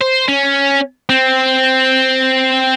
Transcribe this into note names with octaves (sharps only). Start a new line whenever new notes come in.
C5
C#4
C4